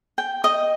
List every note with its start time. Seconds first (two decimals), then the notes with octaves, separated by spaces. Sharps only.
0.18 G5
0.44 D#5